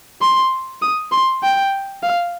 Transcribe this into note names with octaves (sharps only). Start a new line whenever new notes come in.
C6
D#6
C6
G5
F5